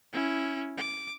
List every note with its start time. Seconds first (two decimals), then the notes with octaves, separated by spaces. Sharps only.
0.13 C#4 E4
0.78 D6